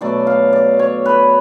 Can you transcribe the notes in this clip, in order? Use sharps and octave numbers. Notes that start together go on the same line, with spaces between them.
B2 F#3 A3 D5
F5
D5
C#5
B4